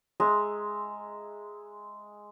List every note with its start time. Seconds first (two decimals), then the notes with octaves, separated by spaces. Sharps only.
0.20 G#3 E5 A#5